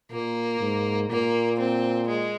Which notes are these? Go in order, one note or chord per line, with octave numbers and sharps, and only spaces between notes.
A#2 A#3
G#2
A#2 A#3
C4
G#3